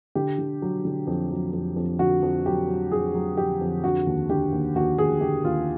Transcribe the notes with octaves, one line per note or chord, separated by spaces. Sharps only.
D3 G4
D3
F#3
D3
F2
F#3
F2
F2
D3 F#4
F2
F#3 G4
F#3
F2 G#4
F#3
F2 G4
F2
D3 F#4
D#2
D3 G4
D#2
D#2 F#4
D#2 G#4
D3 G4
D#2 F4